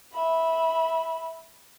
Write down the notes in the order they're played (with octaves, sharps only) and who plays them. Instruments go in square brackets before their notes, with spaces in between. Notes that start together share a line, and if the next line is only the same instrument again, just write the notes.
[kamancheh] E5 B5